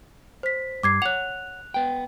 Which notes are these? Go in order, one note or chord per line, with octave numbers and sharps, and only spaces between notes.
C5 B6
G2 D6 G#6 C7
C#5 F#5 F#6 F7
B3 G5